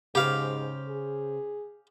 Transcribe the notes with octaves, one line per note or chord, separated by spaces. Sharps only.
G#2 C#3 G4 C5 F5
G#4